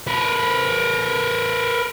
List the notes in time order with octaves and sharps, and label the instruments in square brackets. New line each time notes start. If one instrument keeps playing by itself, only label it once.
[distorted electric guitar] A#4 B4